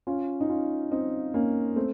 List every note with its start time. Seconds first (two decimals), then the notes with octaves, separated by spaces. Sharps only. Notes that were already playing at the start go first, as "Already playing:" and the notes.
0.07 C#4 F4
0.40 D#4
0.49 C#4 F4
0.91 C4 D#4
1.34 A#3 C#4
1.76 A3 C4